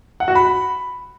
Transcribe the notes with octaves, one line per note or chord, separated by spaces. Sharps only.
F#5
F#4
B5